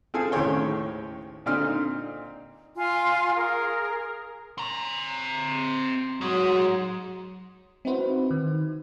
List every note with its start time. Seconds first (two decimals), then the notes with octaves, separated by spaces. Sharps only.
0.14 C4 F4 G#4 A4 G#5
0.32 D#2 A2 C#3 C5 C#5 G5
1.46 A#2 D3 C4 D#4 F6
2.76 F4 F5 G#5 C6
3.34 G#4 A#4
4.58 C4 A#5
6.21 G#2 F#3 G#3
7.85 C4 D#4 E4 F#4 B4 C5
8.31 D#3